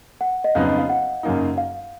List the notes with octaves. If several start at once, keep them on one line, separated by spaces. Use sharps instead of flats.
F#5
D#5
F2 C#3 F#3 B3 D#4 F5
D#5
F5
F#5
F#2 C#3 F#3 A#3 D#4
F5